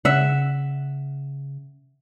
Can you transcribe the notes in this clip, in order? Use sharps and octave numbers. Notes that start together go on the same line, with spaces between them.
C#3 E5 F#5